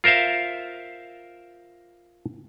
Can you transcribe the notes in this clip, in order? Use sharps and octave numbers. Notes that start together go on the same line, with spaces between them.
F4 A#4 C5 E5 F5